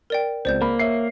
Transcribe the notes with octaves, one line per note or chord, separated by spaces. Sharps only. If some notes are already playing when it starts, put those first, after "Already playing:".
A#4 D5 G5
C#2 C4 C5 D5 G6
A#3 B5
C#5 E5 C7